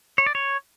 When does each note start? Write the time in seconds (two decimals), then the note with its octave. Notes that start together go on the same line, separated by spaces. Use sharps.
0.18 C#5
0.26 D5
0.35 C#5